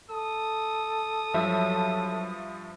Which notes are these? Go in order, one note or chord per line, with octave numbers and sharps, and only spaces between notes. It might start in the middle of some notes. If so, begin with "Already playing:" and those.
A4 D#6
G2 F3 F#3 E5